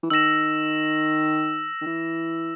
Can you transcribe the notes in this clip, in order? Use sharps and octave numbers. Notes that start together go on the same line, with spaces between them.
E3
D#3 E6 A#6 E7
D#3
E3